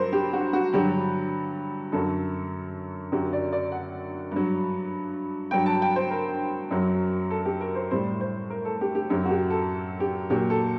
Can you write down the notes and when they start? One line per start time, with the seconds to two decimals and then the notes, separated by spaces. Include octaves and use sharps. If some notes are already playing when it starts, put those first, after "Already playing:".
Already playing: G2 F#3 A#4 C5
0.13 G4
0.33 F#4
0.53 F#4
0.73 G2 D3 F#3 G4
1.92 F#2 D3 F#3 A4
3.12 F#2 D3 F#3 G4
3.33 D5
3.53 D5
3.72 F#5
4.31 G2 F#3
5.51 G2 F#3 G5
5.66 A5
5.82 G5
5.96 C5
6.11 A#4
6.71 F#2 F#3
7.30 A4
7.45 G4
7.61 A#4
7.75 C5
7.91 A2 G3 C5
8.21 C5
8.50 A#4
8.65 A4
8.81 G4
8.95 G4
9.10 F#2 F#3 G4
9.25 F#4
9.30 G4
9.50 A4
10.00 G4
10.30 A#2 F#3 G4
10.50 A4